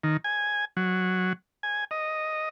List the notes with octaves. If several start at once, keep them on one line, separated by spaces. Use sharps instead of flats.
D#3
G#5
F#3
G#5
D#5